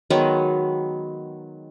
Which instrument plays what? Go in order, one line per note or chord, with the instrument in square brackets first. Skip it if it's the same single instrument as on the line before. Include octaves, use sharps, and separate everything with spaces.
[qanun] D#3 F#3 G#3 B3